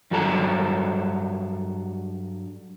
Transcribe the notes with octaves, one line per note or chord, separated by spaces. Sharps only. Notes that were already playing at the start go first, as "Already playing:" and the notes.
G2 F#3 F#4 A4 A5 A#5